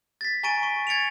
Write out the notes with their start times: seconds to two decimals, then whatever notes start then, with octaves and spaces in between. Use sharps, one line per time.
0.21 A6 B6
0.43 G#5 A#5 C#6 A6 D7 D#7
0.63 C#6
0.87 G#6 A6 C#7 D7 F7